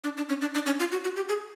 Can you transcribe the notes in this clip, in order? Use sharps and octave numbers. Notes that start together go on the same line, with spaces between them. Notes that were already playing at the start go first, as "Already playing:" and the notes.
D4
D4
C#4
D4
D4
C#4
F4
F#4
F#4
G4
G#4